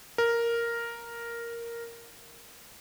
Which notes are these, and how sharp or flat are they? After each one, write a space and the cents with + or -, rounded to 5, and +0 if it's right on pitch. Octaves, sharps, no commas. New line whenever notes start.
A#4 +0